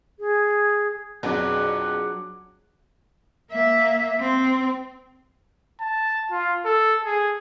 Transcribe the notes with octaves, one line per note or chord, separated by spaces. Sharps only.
G#4
A#1 F2 B2 F#3 D4 G#4 F#5 D6
A#3 E5
C4
A5
F4
A4
G#4